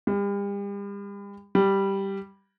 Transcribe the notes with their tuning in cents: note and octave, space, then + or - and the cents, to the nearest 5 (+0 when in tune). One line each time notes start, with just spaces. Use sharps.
G3 +40
G3 +0